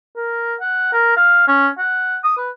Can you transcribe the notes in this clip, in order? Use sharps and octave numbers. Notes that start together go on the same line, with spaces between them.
A#4
F#5
A#4
F5
C#4
F#5
D#6
B4